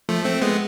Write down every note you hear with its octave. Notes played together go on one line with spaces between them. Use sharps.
F3 A3
A3 C4
G#3 B3